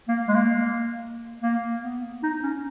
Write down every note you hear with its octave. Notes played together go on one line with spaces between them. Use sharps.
A#3
G#3
A#3
A#3
B3
D#4
C#4